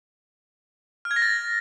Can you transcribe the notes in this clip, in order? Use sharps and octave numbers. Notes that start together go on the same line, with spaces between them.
F6
G#6
A#6
A6